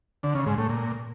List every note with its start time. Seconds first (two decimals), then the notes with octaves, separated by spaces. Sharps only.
0.23 D3
0.35 C#3
0.46 G#2
0.58 A2
0.69 A#2